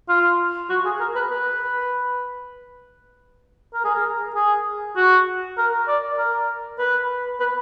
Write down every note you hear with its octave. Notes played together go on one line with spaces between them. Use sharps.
F4
F#4
G#4
A#4
B4
B4
A#4
G#4
A#4
G#4
F#4
A#4
D5
A#4
B4
B4